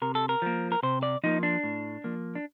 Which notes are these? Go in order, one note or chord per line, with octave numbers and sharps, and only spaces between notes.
C3 A#4
A4
A#4
F3 A#3
A#4
C3 C5
D5
F3 A#3 D#4
D4
A2
F3 A#3
D4